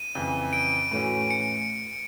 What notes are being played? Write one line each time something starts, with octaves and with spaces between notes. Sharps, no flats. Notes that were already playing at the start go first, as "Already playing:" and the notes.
Already playing: D#7
F2 C#3 E3
D7
A2 E3 A3 C#4 F#4
C#7